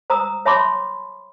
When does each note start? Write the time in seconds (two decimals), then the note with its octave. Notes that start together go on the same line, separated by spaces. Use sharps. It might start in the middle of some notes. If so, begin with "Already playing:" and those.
0.10 C5 A#5 D#6 E6
0.46 C#5 E5 A5 B5 C6 D6